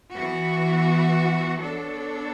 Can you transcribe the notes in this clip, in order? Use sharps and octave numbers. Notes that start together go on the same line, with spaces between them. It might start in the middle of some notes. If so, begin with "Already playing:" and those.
E3 B3 F#4
B3 D4 A4 C#5